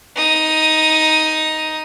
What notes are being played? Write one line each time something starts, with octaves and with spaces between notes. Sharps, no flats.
D#4 D#6